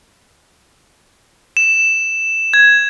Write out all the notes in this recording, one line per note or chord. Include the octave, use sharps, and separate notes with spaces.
E7
G#6